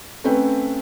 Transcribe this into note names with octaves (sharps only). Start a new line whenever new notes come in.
A3 C4 C#4 B4 G5